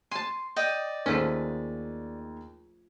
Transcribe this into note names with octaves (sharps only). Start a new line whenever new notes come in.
G#5 A5 C6
D5 D#5 G5
D#2 F3 A3 C#4 D#4 G#4